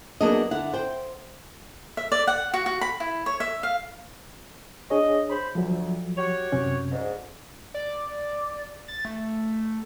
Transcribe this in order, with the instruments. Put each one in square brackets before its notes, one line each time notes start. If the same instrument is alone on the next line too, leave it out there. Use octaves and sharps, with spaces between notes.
[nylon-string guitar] F#3 A#3 B3 D4 G#4 D#5
D3 E4 F#5
C5 G5
[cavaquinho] E5
D5
F#5
F#4
F#4
B5
E4
C#5
E5
F5
[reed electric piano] D4 G#4 C#5 [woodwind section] D#5
[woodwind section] C5 B5
[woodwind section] D2 [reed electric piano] F3 F#3
[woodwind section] F#4 G4 C#5
[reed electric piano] F#2 C3 C#4
[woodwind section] D2 G#2
[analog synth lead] D5
A6
A3